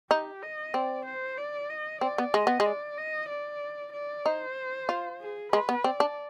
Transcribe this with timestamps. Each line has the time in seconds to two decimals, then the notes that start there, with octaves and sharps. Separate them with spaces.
0.10 D#4 G4
0.43 D#5
0.74 C4 D5
1.06 C5
1.38 D5
1.70 D#5
2.01 C4 D5
2.18 B3
2.34 G#3 D#5
2.47 B3
2.60 G#3
2.66 D5
2.98 D#5
3.30 D5
3.93 D5
4.25 D#4 C5
4.89 F4
5.21 G#4
5.53 G#3 B4
5.69 B3
5.84 C4 D5
6.00 D4